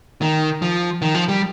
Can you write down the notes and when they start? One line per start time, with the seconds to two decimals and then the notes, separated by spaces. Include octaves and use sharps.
0.22 D#3
0.62 F3
1.02 D#3
1.15 F3
1.28 G3